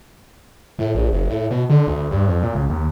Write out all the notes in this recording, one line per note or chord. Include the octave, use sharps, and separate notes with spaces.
A2
A#1
F#1
A2
B2
D3
D2
G2
F2
A#2
C#2
D#2